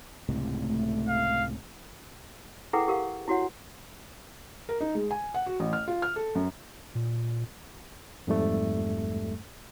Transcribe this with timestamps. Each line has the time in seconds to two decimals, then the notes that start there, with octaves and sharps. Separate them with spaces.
0.29 C#2 A2 C3
0.63 A3
1.08 F5
2.73 E4 G#4 A4 B4 F#5 G5
2.88 G4 A#4 F5 F#5
3.28 E4 F#4 C#5 F#5
4.69 A#4
4.80 D#4
4.95 G#3
5.11 G#5
5.34 F#5
5.46 F#4
5.60 A1
5.73 F6
5.88 F4
6.02 F6
6.16 A4
6.35 F#2
6.95 A#2
8.27 F2 G#2 G3 A3